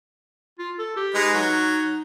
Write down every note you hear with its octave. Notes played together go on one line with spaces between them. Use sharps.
F4
A4
G4
G#3 D#4 B4
F#3 D#4